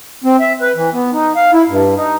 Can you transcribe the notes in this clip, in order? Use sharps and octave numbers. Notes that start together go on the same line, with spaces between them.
C4
E5
B4
E3
B3
D#4
F5
E4
G2
D#4